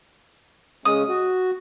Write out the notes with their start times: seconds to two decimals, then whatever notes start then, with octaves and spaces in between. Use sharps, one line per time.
0.85 C#3 G#3 C#4 D#6
1.09 F#4